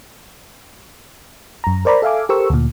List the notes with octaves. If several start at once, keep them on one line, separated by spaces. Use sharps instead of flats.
F#2 A#5
A#4 C5 D5 A#5 B5
A4 E5 F5 G#5 D6
G4 A4 A#4 C5 C#6 E6
D2 A#2